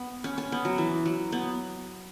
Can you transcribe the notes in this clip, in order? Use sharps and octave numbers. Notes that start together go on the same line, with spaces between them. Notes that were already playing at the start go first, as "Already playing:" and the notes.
Already playing: B3
C#4
C#4
B3
F#3
E3
F#3
B3